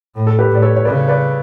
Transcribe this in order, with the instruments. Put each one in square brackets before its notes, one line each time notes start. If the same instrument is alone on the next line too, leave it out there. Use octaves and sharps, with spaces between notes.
[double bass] A2
[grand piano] A4
G4 B4
[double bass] A2 [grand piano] D5
[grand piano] A4 C#5
C#5
[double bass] C#3 [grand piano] B4 D5
[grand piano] B4 D5